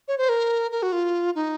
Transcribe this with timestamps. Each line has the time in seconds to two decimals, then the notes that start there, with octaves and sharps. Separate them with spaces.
0.08 C#5
0.18 C5
0.29 A#4
0.72 A#4
0.83 F#4
0.93 F4
1.35 D#4